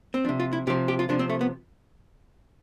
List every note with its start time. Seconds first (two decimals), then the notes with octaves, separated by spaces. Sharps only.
0.14 C4
0.24 F3 D4
0.29 C3
0.40 F4
0.53 E4
0.67 C3 F3 G4
0.88 G4
0.99 F4
1.09 C3 F3 D4
1.19 C4
1.29 A3
1.41 B3